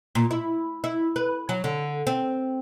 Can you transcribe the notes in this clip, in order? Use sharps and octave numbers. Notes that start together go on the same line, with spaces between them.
A#2
E4
E4
B4
F#3
D3
C4